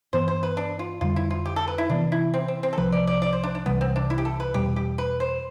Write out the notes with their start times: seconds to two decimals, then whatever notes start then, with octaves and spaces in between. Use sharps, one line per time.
0.13 G2 E3 B3 C5
0.28 C5
0.43 B4
0.57 D4
0.79 F4
1.01 F2 D3 G3 F4
1.16 E4
1.31 F4
1.46 G4
1.56 A4
1.68 B4
1.78 E4
1.90 C3 E3 B3 D4
2.12 E4
2.34 C4
2.48 C4
2.63 C4
2.73 A4
2.78 C2 C3 F3 B4
2.92 D5
3.07 D5
3.22 D5
3.33 C5
3.44 D4
3.55 D4
3.66 C2 C3 E3 G3 B3
3.81 C4
3.96 D4
4.10 E4
4.18 G4
4.25 A4
4.40 B4
4.54 E2 B2 G3 G4
4.76 G4
4.98 B4
5.20 C5